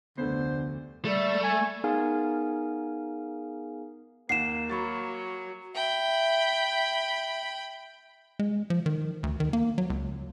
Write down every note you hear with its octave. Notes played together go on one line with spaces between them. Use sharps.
F1 D2 D3 B3 C5
G3 A3
G#5
B3 D#4 G#4 A#4 F5 G#5
D#2 A#3 F#5 C7 E7
F#3 B5 C#6 A6
E5 G5 B5
G#3
F3
D#3
D2
D#3
A#3
F#3
C#2